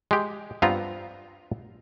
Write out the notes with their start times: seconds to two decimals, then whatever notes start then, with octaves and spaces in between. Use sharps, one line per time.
0.11 G#3 G4
0.62 G2 B3 C4 F4 A#5